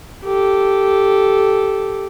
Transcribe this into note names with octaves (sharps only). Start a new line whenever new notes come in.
G4 A4